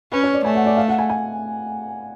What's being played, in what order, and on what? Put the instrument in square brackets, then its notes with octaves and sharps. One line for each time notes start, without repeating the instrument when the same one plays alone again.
[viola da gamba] C#4 [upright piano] B4
[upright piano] C#5
D5
[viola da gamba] A3 [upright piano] G#5
[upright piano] F#5
D5
F5
F#5
G#5
G#5